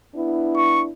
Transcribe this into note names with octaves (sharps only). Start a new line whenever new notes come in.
B3 D4 E4
C#6